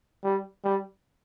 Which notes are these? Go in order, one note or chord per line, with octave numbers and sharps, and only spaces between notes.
G3
G3